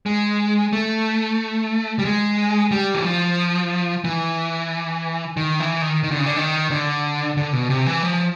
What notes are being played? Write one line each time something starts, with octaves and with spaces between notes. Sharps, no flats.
G#3
A3
G3
G#3
G3
E3
F3
E3
D#3
E3
D#3
D#3
D3
C#3
D3
D#3
D3
D3
B2
C3
E3
F3